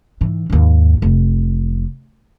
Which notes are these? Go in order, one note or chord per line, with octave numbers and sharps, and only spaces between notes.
G#2 E3
D#2 G#2
F1